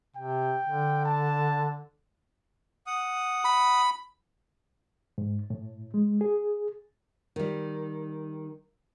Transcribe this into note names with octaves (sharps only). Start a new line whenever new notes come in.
C3 G5
D3
A5
F#5 D#6
B5
G#2
A2
G#3
G#4
D#3 G3